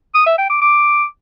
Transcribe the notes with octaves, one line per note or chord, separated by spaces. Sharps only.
D#6
E5
G5
D6
D6